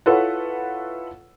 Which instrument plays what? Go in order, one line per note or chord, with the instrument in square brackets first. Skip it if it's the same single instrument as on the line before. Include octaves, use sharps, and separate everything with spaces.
[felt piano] E4 F4 A4 B4 C#5 F#5